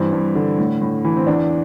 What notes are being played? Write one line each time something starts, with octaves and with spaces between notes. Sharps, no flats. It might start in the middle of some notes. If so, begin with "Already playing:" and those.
Already playing: G2 E3 C4
G2
D3
A2
A2
E3
C4
E2 D4